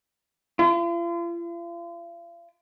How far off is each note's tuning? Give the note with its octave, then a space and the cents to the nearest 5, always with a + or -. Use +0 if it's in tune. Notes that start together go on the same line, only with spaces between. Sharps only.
F4 -40